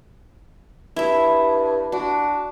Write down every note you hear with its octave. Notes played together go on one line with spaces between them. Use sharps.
G2 E4 E5
D4 F#4